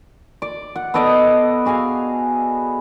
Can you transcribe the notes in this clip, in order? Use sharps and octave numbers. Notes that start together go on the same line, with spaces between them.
D5
F#5
B3 A4 D5 D#5
F#4 G#4 F5 G#5